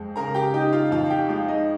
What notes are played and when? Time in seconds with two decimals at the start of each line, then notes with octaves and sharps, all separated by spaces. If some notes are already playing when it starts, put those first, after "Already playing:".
Already playing: F2 G#3
0.16 C#3 A#4 A#5
0.34 G4 G5
0.54 D#4 G4 G5
0.72 F4 F5
0.91 F2 F4 F5
1.10 G4 G5
1.29 G#3 F4 F5
1.48 D#4 D#5